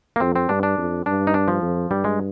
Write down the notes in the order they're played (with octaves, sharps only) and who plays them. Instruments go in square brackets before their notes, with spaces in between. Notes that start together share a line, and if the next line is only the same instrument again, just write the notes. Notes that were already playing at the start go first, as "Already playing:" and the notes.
[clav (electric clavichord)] A#3
[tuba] F2 [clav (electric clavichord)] C4
[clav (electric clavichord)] C4
[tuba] G2 [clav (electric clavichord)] D4
[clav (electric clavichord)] D4
[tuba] F2
[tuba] G2 [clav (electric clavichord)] D4
[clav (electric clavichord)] D#4
D4
F3
[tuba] F2
[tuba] G2 [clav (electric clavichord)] G3
[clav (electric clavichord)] G#3